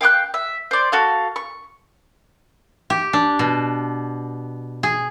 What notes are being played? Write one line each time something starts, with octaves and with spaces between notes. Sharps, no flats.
F5 G5 D6 F#6
E5
C5 D5
F#4 A4 F5
C#6
G4
D4
B2
G#4